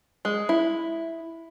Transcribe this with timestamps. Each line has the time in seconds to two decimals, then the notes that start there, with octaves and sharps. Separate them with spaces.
0.25 G#3
0.49 E4